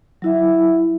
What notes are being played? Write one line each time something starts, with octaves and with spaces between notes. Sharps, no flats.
F#3 E4 E5